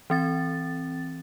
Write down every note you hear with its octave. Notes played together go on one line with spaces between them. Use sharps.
E3 C4 A6